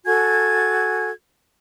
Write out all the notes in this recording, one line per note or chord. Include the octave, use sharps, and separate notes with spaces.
F#4 A4 G#5 G#6